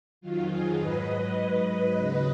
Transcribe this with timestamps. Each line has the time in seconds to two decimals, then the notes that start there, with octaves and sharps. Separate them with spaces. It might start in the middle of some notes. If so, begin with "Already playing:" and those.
0.21 F2 D#3 F#3 F4
0.49 F4 G#4
0.78 G#2 F#3 B4 D#5
1.36 G#2 F#3
1.94 D#2 C#3 F#3